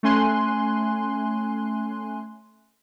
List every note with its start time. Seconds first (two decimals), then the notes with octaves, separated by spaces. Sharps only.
0.03 A3 C#4 G#5 C6 F#6